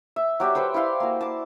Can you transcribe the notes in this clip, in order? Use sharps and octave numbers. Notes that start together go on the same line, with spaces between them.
E5
F#3 G4 D5 E5
A4 B4 C5 G5
E4 D5 F5 C6
A#3 F#4
A5 D6